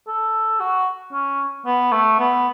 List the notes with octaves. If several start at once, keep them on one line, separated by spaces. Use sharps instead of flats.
A4
F#4
C#4
B3
A3
B3